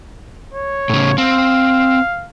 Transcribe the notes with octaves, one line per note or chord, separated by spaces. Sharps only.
C#5
A2 C#3
C4 F5